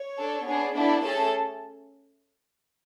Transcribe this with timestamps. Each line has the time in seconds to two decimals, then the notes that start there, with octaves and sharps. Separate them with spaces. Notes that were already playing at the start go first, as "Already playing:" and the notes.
Already playing: C#5
0.16 D4 A4
0.46 B3 D4 G#4
0.74 B3 D4 E4 A4 D5
1.03 A3 C#4 G#4 A4 A5